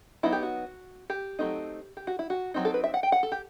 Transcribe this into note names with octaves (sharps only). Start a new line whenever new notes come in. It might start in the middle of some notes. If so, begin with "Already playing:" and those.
F#3 B3 D#4 E4
G4
F#4
G4
F#3 A3 C4 D#4
G4
F#4
E4
F#4
F#3 C4 D#4
A4
B4
E5
F#5
G5
F#5
A4
G4